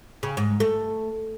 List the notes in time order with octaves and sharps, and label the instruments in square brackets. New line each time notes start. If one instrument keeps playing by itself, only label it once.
[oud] C#3
G#2
A3